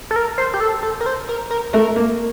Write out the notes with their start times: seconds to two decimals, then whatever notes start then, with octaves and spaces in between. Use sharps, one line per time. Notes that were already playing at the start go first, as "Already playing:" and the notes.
0.11 A4
0.16 A#4
0.38 C5
0.54 G4
0.60 A4
0.83 A4
1.01 A#4
1.06 C5
1.29 A#4
1.51 A#4
1.73 A3 A#4
1.96 A#3